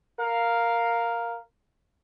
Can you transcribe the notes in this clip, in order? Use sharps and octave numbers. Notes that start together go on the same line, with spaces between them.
A#4 F5